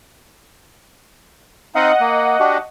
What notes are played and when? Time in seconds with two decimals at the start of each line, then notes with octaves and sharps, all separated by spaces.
1.75 C4 D#4 D#5 F5 F#5
2.00 A#3
2.40 D4 F#4 G4